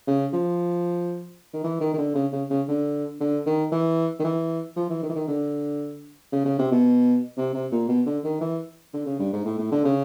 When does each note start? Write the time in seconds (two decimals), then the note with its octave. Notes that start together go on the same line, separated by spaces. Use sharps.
0.07 C#3
0.33 F3
1.54 D#3
1.64 E3
1.80 D#3
1.93 D#3
1.98 D3
2.15 C#3
2.32 C#3
2.50 C#3
2.68 D3
3.20 D3
3.46 D#3
3.72 E3
4.20 D#3
4.24 E3
4.76 F3
4.89 E3
5.03 D#3
5.09 E3
5.16 D#3
5.28 D3
6.33 C#3
6.45 C#3
6.59 C3
6.72 B2
7.37 C3
7.54 C3
7.72 A#2
7.89 B2
8.06 D3
8.24 D#3
8.41 E3
8.94 D3
9.06 C#3
9.19 G2
9.33 G#2
9.45 A2
9.58 A2
9.72 D3
9.85 C#3